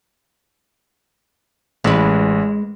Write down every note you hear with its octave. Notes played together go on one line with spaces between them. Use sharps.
A1 G#3 B4